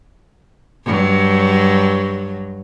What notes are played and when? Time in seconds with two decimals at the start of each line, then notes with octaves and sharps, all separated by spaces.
0.85 G2 F#3